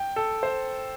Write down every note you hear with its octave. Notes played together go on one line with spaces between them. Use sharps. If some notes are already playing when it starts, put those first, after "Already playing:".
Already playing: G5
A4
C5